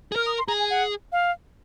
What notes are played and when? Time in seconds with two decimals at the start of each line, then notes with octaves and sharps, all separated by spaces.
0.12 G#4
0.16 A#4 F6
0.26 D#6
0.38 C6
0.48 G#4 A#5
0.60 G#5
0.70 F#5
1.12 F5